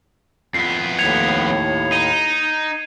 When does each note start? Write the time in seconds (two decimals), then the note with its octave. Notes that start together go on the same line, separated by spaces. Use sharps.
0.54 F2 B3 C7
0.99 D#2 A2 G#6 C#7 F7
1.92 D#4 D#7